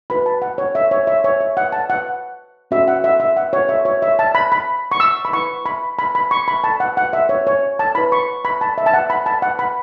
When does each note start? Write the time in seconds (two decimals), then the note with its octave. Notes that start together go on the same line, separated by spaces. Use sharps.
0.10 F#4 B4 B5
0.26 A5
0.42 F#5
0.58 C#5
0.75 E5
0.91 C#5
1.07 E5
1.24 C#5
1.41 E5
1.57 F#5
1.72 A5
1.90 F#5
2.71 C#4 F#4 A4 C#5 E5
2.88 F#5
3.04 E5
3.20 E5
3.37 F#5
3.53 C#5
3.69 E5
3.85 C#5
4.02 E5
4.19 A5
4.35 B5
4.52 B5
4.92 C#6
5.00 E6
5.25 B5
5.33 E4 B4 C#6
5.66 B5
5.99 B5
6.15 B5
6.31 C#6
6.48 B5
6.64 A5
6.80 F#5
6.97 F#5
7.13 E5
7.29 C#5
7.47 C#5
7.79 A5
7.95 E4 B4 B5
8.12 C#6
8.45 B5
8.61 A5
8.78 E5
8.86 A5
8.94 F#5
9.10 B5
9.26 A5
9.42 F#5
9.59 B5